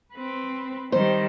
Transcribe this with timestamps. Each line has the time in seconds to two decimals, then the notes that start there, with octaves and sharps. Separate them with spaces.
0.13 C4 B4
0.92 D#3 G3 C5